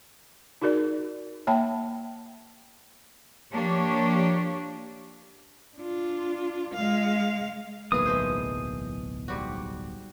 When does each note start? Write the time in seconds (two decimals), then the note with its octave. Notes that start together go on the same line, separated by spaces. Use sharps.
0.62 D#4 F#4 G#4 A#4 D5
1.47 A#3 C#5 E5 G5 A5 B5
3.52 F3 A#3 D4 G4 C#5
5.77 D4 F4
6.74 G#3 F5
7.92 D1 B1 E3 A#3 G#4 D#6
8.06 G#3 A3 C5
9.28 G#2 G3 F#4